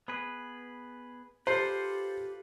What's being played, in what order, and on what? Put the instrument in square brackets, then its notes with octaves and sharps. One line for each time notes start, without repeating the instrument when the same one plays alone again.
[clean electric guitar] B3 G#4 B4
[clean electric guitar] F4 A4 B4 [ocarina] G4 [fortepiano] C5